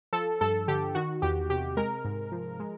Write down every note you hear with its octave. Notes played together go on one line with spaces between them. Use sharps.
F3 A4
G2 A4
D3 G4
D#3 F#4
E2 G4
C3 G4
G#3 A#4
G#2
F3
G#3